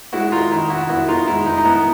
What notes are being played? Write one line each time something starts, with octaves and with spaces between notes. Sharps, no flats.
G#3 E4 F#4
D#4 F4
D#3 E4
E4 F#4
B3 E4 F#4
D#4 F4
G#3 E4
D#4
D#4
B3 E4